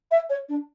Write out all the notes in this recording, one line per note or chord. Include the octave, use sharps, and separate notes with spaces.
E5
C#5
D4